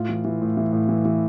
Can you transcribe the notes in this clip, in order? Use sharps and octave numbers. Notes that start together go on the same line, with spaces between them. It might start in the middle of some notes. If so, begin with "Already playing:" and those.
Already playing: A2 F4
E3
E3
A2
E3
A2
E3
E3